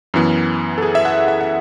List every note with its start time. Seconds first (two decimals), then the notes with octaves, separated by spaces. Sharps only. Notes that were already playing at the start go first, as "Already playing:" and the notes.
0.14 F#2 E3 B3
0.78 A4
0.82 G#4
0.95 E5
1.05 F#5
1.28 E5
1.41 F#5